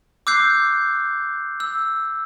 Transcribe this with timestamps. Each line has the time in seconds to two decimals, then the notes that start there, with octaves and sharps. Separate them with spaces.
0.27 D6 E6 F#6 G6 C7
1.60 E6